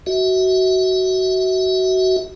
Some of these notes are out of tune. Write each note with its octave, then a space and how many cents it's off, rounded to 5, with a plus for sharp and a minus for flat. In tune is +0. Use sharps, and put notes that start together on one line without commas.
F#4 +20 E5 -30